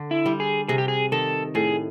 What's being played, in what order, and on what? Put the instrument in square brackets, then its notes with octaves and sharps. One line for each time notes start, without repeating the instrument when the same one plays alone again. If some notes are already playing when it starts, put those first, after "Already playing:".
Already playing: [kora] D3
[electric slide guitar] E4
[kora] G3
[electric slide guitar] G#4
[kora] C3 [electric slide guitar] G#4
[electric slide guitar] G4
G#4
[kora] D#3 [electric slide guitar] A4
[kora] A2 [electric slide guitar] G#4